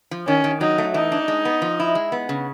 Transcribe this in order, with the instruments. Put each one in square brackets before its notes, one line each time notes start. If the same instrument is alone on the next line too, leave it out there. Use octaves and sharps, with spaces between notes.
[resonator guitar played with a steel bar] F3
[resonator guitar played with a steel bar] D#3 [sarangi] C#4
[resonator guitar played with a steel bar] D#3
[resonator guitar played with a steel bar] F#3 [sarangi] D#4
[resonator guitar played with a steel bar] A3
[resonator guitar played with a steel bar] E3 [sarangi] D#4
[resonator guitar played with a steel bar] D4
G#3
B3
F3
E4
G#3
B3
C#3